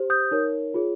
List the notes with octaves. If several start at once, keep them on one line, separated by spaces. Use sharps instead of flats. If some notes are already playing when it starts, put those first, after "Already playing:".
Already playing: G4 C5
D#6 G6
D#4 A#4 C#5
F4 G#4 C#5